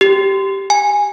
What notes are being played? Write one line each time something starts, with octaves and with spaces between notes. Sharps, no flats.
G4
G#5